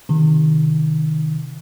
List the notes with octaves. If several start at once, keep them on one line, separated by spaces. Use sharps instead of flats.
C3 D#3